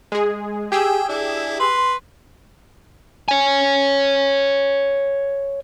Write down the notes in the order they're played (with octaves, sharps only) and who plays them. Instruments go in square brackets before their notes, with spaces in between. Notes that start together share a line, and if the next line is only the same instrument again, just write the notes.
[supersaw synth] G#3 G#4
[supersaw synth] G4 G#4 E6 [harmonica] G5 G#5
[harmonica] D4 E4
B4 C6
[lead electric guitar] C#5 G#5